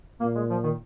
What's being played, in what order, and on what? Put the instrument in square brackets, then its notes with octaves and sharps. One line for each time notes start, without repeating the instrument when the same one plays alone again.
[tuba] A#2 [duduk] A#3
[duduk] G#3
F3
D#3